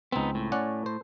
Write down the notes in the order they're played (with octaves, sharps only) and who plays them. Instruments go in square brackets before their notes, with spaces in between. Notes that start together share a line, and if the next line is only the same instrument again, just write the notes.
[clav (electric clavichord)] C#2 C4 [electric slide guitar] B3 D#4
[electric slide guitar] A2
[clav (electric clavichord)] C#4 D5 F#5
C5